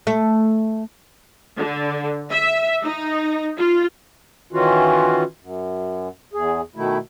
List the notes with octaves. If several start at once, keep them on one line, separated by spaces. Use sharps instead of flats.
A3
D3
E5
D#4
F4
D#3 E3 C#4 F4 F#4
F#2
E2 G#4
B2 D#3 A3 E4